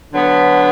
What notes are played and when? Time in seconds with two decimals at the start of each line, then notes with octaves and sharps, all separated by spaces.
0.13 D3 F#3 B3